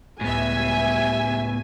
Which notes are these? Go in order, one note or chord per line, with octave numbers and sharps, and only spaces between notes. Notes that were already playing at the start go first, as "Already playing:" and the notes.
C#2 A2 G3 B3 E5 G#5